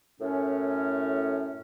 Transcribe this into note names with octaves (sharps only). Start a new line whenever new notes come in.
F#2 A2 C#4